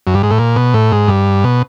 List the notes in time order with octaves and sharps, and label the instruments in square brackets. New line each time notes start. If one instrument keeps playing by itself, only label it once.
[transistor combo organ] F#2
G2
G#2
A2
A#2
B2
A2
G#2
G2
B2